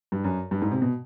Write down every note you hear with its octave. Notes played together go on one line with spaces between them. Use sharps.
G2
F#2
G2
G#2
C3
B2